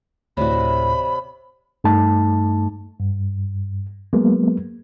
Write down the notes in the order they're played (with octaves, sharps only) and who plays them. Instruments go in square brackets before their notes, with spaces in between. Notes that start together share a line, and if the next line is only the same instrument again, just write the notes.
[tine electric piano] D2 A2 [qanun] C3 F#4 [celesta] C#5 D5 [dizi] B5
[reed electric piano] G2 A3 D#4 A5
G2
F#3 G#3 A#3 B3